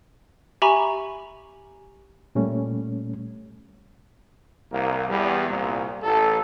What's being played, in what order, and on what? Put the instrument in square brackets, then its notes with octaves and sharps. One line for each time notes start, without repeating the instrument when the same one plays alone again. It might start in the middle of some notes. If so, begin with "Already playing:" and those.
[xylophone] G4 E5 G#5 A#5 B5 C#6
[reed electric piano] A#2 G3 A3 C#4
[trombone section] C2 A#3
E2 G3
C2 A#2
A1 A4